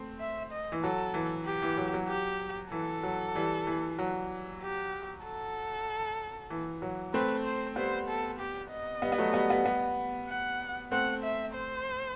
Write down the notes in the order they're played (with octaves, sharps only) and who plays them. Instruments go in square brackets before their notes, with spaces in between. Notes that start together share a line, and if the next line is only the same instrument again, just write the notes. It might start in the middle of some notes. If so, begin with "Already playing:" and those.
Already playing: [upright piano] A3 C4
[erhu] E5
D#5
[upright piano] E3
[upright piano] F#3 [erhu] A4
[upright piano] E3
[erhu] G4
[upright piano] E3
F#3
F#3
[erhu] G4
[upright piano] E3 [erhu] A4
[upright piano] F#3
E3 G3
E3
F#3
[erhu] G4
A4
[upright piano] E3
F#3
[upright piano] A3 C4 [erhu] B4
[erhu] C5
[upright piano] G3 B3 [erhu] C5
[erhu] A4
G4
D#5
[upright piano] G3 B3
B3
F#3 A3
G3 B3
G3 B3
G3 B3
[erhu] F#5
[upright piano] A3 C4 [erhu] F#5
[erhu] E5
C5